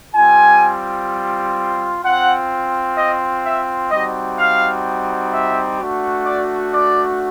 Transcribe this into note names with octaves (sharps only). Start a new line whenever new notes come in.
G3 C4 F4 G#5
C4 F4 F#5
D#5
E5
G3 C4 D#4 F#4 D#5
F5
E5
A3 D4 F#4
D5
D5